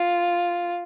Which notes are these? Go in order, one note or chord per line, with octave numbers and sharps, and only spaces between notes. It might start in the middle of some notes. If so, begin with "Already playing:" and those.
Already playing: F4